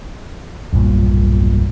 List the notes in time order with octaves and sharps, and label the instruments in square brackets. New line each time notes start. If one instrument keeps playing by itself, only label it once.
[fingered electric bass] E1 B1 G2 A#2